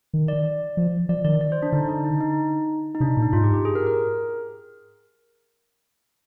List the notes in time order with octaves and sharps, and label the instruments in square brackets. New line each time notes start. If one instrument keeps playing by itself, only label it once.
[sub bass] D#3
[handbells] D5
[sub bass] F3
[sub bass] F3 [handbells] D5
[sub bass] D#3 [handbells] D5
[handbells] D5
C5
D4
[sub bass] D3 [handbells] D#4
[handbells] D4
D#4
D#4
D#4
[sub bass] C3 [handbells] D4
[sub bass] A#2
[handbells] D#4
[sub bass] G#2 [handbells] F4
[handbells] G4
G4
G#4
A#4
A#4